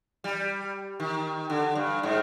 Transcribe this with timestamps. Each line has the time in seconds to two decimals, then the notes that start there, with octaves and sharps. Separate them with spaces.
0.24 G3
1.00 D#3
1.50 D3
1.75 G2
2.03 G#2